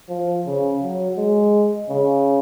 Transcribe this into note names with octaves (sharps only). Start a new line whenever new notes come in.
F3
C#3
F#3
G#3
C#3